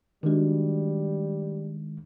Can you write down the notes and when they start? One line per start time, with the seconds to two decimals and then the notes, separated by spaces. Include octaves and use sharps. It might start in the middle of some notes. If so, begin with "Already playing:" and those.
0.23 D#3 G3 G#3 D4 F#4